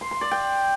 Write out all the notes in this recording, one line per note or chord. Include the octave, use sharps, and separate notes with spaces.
C6
C6
D5
G5